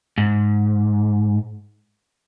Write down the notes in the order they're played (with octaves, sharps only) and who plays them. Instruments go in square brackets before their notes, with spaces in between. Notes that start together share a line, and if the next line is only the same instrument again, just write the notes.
[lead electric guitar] G#2